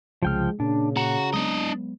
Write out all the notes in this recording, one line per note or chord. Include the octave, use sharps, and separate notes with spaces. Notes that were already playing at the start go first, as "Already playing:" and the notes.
C2 C#3 F3 G#3 G5 F6
A#2 C#3 D4
F#4 A#5
F#3 G#3 B3 D4 D#5